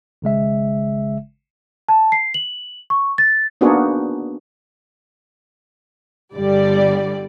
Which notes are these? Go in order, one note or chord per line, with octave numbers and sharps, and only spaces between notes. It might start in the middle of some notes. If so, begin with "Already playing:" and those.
G#1 C#3 G#3 E5
A5
C7
F#7
C#6
A6
A#3 B3 D4 D#4 F#4 G#4
G1 D3 G3 D5